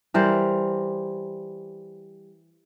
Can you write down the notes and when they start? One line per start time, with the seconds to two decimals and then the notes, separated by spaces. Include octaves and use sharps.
0.14 E3 G3 A#4 C5